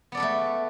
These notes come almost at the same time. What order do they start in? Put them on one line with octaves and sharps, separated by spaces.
B3 D5 A4 B4 A3